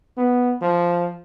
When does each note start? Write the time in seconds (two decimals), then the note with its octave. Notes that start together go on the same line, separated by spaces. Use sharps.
0.17 B3
0.62 F3